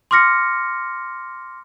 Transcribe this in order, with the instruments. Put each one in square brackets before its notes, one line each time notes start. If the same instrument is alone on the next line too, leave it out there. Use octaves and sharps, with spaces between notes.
[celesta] C6 D6 F6 A#6 C#7